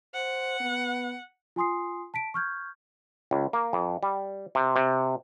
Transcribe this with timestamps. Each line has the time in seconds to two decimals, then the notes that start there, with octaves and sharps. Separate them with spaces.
0.14 C5 F#5
0.60 B3
1.56 F4 G#5 C6 D#6 C7
2.14 A5 B6 D7
2.34 C#6 F6 G6 G#6
3.31 C#2
3.53 A#3
3.73 F2
4.03 G3
4.55 C3
4.76 C3